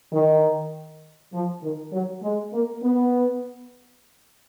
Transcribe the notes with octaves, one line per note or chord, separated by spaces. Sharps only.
D#3
F3
D#3
F#3
G#3
A#3
B3